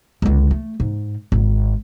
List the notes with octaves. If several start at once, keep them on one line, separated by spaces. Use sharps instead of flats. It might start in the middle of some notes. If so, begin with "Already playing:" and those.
C#2 D3
A3
G#2
G#1